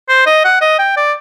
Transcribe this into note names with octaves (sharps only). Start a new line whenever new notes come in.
C5
D#5
F#5
D#5
G5
D5